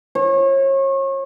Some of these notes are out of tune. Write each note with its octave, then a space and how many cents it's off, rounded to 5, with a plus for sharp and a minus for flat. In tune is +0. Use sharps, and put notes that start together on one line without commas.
C#5 -35